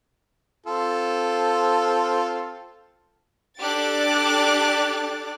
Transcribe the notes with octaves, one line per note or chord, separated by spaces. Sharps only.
C4 F4 A4
D4 G4 A4 D6 F#6 A6